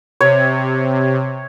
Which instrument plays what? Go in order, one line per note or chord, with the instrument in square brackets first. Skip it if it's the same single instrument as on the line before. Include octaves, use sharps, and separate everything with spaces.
[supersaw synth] C3 [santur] C#5